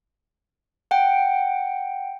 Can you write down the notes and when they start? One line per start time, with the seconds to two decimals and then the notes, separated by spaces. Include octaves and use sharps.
0.91 F#5 G5